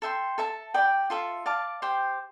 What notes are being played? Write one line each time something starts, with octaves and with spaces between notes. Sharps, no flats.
A4 E5 G5 C6
A4 E5 A5
G4 D5 G5 B5
F4 A4 E5
D5 F5 A5 D6
G4 C5 G5